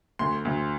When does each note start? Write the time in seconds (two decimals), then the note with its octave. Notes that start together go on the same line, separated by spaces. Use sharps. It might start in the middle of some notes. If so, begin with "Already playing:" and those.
0.19 D2 C6
0.45 D2